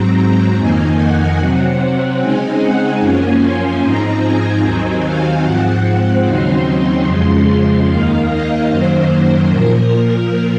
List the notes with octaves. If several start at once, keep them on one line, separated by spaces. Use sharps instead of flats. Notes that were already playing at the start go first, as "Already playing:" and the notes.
Already playing: G#2 F#3 C4 A#5
F2 D#3 A#3 D#4 G#5
F#5
C3 F#3 C4
C#3 G#3 C4 D#4 G#5
F#5
F#2 F3 A#3 C#4 G#5
C6
G#2 F3 C4 D#4 A#5
G#5
D#2 D#3 F#3 C4 D#4
F5
G#2 F3 C4 F#5
D#2 C#3 F#3 C4 D#4 C6
F2 C#3 F3 G#3 C6
D#2 D#3 A#3 D#4 F5
D#5
F#2 D#3 F#3 A#3 C5
A#2 F3 A#3 A#4